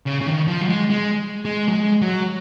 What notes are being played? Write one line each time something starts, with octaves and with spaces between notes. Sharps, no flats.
C#3
C#3
D#3
F3
F#3
G#3
G#3
G#3
F#3
G#3
F#3